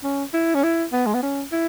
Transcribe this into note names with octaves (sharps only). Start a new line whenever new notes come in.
C#4
E4
C#4
E4
B3
G#3
B3
C#4
E4